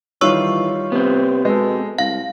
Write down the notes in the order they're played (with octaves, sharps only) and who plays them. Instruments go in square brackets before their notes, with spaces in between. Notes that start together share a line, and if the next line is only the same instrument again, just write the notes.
[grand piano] D#3 G3 F4 [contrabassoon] E3 [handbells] C#5 C#6 E6
[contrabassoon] C3 [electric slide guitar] B3 C4
[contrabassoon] B2 [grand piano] G#3 A4
[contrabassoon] C2 [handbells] F5 [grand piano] A#6